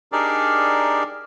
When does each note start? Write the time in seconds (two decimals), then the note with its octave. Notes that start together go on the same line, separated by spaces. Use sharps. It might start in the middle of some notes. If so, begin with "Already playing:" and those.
0.12 D4 D#4 G4 G#4 A#4 D5